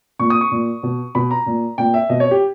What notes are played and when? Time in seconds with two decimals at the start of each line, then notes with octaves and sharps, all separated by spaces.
0.19 A#2 C#6
0.30 D#6
0.41 C#6
0.51 A#2
0.83 B2
1.15 B2 B5
1.31 A#5
1.46 A#2
1.78 A#2 G5
1.94 E5
2.09 B2 D#5
2.20 C#5
2.31 G4